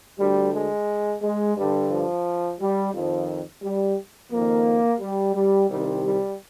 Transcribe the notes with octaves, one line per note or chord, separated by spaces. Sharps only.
D2 D3 G3
G#3
G#3
G2 D3 G3
F3
G3
F2 D#3 F3
G3
F2 D#3 A#3
G3
G3
C2 C3 D#3 G3
G3